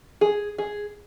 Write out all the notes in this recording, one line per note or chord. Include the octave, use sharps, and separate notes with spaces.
G#4
G#4